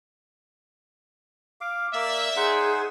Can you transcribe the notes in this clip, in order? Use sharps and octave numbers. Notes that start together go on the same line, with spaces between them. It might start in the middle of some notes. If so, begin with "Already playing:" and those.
F5 D6
A#3 D5 E5
D#4 G#4 C5 F#5